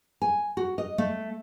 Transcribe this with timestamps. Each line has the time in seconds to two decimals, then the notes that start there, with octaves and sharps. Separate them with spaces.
0.22 G#5
0.57 F#4
0.78 D#5
0.98 A3